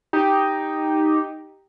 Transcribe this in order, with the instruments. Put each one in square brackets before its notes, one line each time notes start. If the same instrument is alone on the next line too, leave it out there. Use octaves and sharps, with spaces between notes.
[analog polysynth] D#4 G4